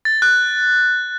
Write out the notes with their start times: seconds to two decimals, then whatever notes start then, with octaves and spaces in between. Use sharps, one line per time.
0.05 A6
0.22 F#6